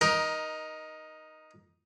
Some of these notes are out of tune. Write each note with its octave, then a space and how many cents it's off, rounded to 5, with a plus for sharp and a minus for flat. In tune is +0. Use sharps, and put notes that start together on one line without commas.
D#4 +0 A#4 +20